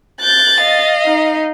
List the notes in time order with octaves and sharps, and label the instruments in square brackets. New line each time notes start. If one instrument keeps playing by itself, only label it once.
[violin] F#6 G6 [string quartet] A6
[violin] D#5 F5
[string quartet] D#4